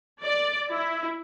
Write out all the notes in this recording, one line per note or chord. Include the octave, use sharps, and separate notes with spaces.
D5
E4